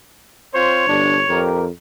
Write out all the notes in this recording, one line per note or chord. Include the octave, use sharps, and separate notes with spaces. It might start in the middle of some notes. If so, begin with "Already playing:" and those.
C4 F4 C5 C#5
G1 D4
F2 G4 A#4